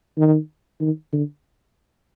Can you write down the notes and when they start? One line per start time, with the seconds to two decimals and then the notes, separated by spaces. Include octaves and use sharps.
0.18 D#3
0.81 D#3
1.13 D3